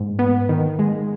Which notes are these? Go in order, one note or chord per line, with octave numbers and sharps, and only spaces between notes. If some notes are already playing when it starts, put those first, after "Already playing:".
Already playing: G#2
B3
D#3
G#3